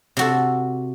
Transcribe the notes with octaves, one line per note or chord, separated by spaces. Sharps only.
C3 F#4 A4